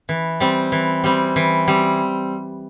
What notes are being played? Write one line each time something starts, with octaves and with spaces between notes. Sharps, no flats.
E3
G3 C4
E3
G3 C4
E3
G3 C4